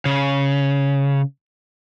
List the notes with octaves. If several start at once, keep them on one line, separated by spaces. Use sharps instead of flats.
C#3